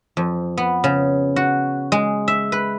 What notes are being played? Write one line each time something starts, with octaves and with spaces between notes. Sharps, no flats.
F2
B3
C#3
F#4
G#3
E5
B4